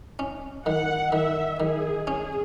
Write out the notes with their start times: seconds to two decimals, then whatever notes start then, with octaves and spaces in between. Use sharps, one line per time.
0.19 C#4
0.66 D#3 F#5
1.12 D#3 E5
1.60 D#3 G#4
2.07 C#4 G#4